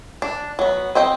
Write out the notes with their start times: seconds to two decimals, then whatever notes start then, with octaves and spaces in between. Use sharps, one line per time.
0.22 D4
0.59 F#3 B3
0.95 C4 D#5 G5